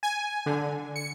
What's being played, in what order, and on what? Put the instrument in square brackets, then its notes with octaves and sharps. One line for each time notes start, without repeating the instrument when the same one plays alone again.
[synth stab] G#5
D3
C#7